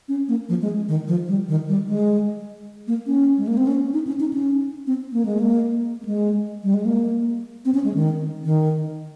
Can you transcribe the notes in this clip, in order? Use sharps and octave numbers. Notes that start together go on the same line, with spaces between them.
C#4
A#3
F3
G#3
D#3
F3
G3
D#3
G3
G#3
A#3
C#4
G#3
A#3
C4
C#4
D#4
C#4
D#4
C#4
C4
A#3
G#3
A#3
A#3
G#3
G3
G#3
A#3
C4
C#4
G#3
D#3
D#3